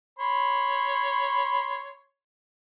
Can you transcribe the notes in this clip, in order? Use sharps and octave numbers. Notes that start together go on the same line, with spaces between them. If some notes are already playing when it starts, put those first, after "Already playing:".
C#5 B5 C6